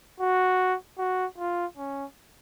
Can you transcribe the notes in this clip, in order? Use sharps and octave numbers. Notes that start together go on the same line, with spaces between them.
F#4
F#4
F4
C#4